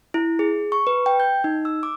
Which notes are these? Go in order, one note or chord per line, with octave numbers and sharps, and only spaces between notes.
E4
G#4
C#6
B4
G5
G6
D#4
E6
D6